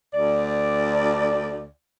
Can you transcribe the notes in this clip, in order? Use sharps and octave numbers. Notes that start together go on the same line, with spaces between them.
D2 D5